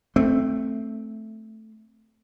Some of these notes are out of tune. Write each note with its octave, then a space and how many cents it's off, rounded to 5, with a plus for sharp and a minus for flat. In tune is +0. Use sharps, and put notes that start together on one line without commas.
A3 +0 C4 +0